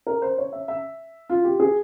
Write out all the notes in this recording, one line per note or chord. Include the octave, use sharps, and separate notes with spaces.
A#4
C5
C#5
E5
E5
F4
G4
G#4